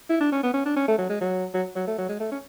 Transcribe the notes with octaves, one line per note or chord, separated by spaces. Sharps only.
E4
D4
C#4
B3
C#4
D4
C#4
A3
F#3
G#3
F#3
F#3
F#3
A3
F#3
G#3
A3
C#4